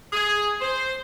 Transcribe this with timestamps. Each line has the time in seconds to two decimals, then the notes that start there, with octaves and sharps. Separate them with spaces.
0.13 G#4
0.61 C5